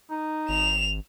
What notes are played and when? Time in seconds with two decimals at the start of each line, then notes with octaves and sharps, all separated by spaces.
0.10 D#4
0.49 G#1 E7 F7